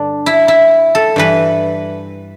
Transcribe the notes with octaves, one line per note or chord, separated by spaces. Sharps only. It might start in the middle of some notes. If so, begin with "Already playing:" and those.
Already playing: G2 D3 D4
E4
E4
A4
G2 E3 B4